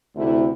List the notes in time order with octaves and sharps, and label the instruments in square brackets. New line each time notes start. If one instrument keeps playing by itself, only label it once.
[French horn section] D2 C3 A3 E4